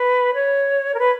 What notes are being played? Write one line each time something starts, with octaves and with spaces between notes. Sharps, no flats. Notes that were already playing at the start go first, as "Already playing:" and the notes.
Already playing: B4
C#5
A#4
B4